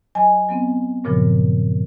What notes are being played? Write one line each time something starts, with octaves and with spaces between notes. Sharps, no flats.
F#3 D#5 G#5
F#3 B3 C4
G2 A#2 C#3 F3